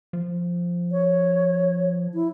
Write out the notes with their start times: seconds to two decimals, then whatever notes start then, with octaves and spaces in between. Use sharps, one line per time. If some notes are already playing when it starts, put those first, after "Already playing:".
0.13 F3
0.92 C#5
2.14 E4